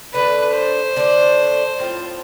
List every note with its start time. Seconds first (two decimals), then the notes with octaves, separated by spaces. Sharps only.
0.14 D3 A3 D4 B4
0.55 C5
0.96 D3 A3 D4
1.78 A2 F3 C4 F4